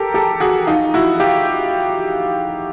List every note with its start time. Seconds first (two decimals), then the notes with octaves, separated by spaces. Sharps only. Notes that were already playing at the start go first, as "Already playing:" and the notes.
Already playing: G4 A4 A#4
0.14 G4 A4
0.40 F#4 G#4
0.67 D#4 F4
0.94 E4 F#4
1.20 F4 G4